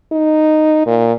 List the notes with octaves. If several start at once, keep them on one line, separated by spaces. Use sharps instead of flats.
D#4
A#2